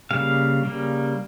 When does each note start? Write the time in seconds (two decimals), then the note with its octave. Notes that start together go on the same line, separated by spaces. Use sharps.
0.11 C#3 G3 A#3 F5
0.63 C#3 G3 A#3